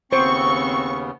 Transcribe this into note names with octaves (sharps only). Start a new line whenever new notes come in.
D#2 C#3 B3 C4 C5 C#6